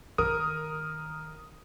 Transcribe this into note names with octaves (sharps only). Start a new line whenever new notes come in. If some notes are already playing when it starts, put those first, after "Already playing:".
D#3 A#4 D#6